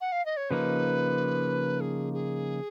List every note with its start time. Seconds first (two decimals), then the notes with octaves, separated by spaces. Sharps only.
0.01 F#5
0.12 F5
0.26 D#5
0.37 C#5
0.50 C#3 F3 A#3 D#4 B4
1.81 G#4
2.13 G#4